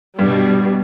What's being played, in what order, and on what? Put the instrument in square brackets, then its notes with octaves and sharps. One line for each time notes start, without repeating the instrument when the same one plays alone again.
[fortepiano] G2 [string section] B2 G3